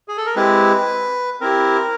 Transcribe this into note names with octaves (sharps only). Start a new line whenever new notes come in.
G#4
A4
A#4
G#3 C4 E4 G4 B4
C4 E4 G4 A#4